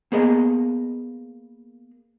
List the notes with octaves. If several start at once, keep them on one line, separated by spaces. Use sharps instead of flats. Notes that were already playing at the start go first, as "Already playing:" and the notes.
A#3 B3 G#4 D#5